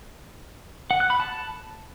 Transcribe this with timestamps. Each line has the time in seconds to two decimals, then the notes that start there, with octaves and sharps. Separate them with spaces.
0.91 F#5
1.00 F#6
1.10 B5
1.20 A5